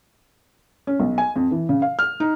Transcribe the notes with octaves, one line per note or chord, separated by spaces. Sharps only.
C#4
B1
G#5
F2
E3
C#3
F5
F6
D#4